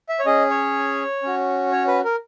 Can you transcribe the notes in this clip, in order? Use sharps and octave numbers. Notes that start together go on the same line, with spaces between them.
E5
C#5
C#4 G#4 D#5
C#5
C#4 F#4
C#5
B4
A#4